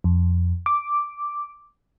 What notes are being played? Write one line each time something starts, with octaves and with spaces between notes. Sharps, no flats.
F2
D6